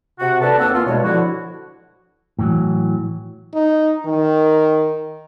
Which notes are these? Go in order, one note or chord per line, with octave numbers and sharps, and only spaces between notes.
C3 F#4 F#5
D4 A4 B4 A5
D#2 A#3 C4 F#4 F#5 E6
E3 A#3 B3 F4
G2 B2 G#3 C#5
D3 F3 E4 F#4
A2 E3 F#3
D#4
D#3